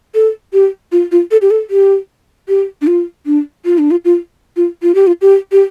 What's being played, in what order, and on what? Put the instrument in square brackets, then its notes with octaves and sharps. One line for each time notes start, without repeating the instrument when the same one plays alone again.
[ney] A4
G4
F4
F4
A4
G4
A4
G4
G4
D4
F4
D4
F4
D4
F4
F4
F4
F4
G4
F4
G4
G4